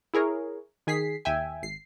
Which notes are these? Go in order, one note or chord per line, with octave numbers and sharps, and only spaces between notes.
E4 G#4 A#4 C#5
D#3 G#4 B6 C7
D#2 E5 G5 G#5
G#1 C7